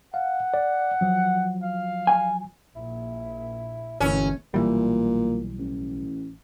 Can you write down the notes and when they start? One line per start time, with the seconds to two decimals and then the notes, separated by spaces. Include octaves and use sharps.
0.14 F5 F#5
0.54 D5
1.01 F3 F#3
1.62 F5
2.07 G#5
2.76 A#1 E4
4.00 G1 C#2 B2 E3 A3 C#4
4.54 B1 A#2 E3 G3
5.59 A1